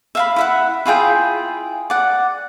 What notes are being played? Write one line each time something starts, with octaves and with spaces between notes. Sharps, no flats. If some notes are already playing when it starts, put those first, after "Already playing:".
E5 F5 B5
E4 E5 F#5
E4 F4 G#4 G5
D5 F#5